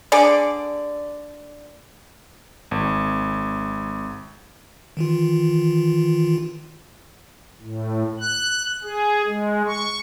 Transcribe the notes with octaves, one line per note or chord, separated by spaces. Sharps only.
D3 G#4 D5
G#1
D#3 E3 F4
A2
F#6
G#4
G#3
C#6